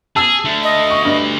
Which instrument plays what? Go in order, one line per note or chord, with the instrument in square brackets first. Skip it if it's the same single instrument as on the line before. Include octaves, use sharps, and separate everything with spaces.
[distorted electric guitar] G#4 [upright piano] A5 E6
[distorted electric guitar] D3 A3
[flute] D#5
[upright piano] C#6
G2